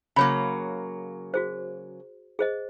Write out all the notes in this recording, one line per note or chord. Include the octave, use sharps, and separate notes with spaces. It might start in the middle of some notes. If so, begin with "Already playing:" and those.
C#3 F#3 A#3 C#5 B5
F#4 G#4 C5
G#4 C5 D#5